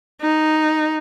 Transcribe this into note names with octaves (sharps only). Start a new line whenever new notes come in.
D#4